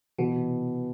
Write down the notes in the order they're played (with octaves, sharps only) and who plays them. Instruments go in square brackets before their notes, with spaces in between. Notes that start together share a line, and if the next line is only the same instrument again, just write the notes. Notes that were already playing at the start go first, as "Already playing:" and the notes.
[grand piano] B2 [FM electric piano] E3
[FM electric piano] C3